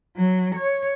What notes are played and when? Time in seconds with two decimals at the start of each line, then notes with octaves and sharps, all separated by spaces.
0.17 F#3
0.55 C#5